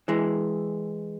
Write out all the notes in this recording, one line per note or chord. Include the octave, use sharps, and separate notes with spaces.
E3 G#3